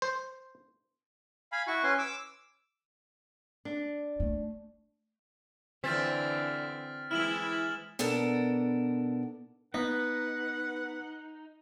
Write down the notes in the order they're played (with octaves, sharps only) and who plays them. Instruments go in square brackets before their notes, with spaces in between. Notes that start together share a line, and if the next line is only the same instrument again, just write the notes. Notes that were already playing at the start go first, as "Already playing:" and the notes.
[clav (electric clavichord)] C5
[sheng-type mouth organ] F5 G#5 B5
E4 F#4 C#6
C#4 B4 G#5 C6
D6 E6
[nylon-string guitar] D4
[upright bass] A3
[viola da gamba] D3 E3 [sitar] C4 [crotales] F6 A6 B6
[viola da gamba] E3 G#3 [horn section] E4 [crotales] F6 E7 F#7
[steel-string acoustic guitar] B2 B3 D4 A4 A#4
[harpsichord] B3 [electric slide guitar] D#4 [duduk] B4 [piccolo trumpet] F#5